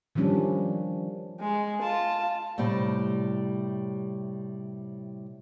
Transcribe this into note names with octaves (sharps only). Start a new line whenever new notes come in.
D#3 F3 G3 C#4 D4
G#3
F4 A5
A2 C3 G3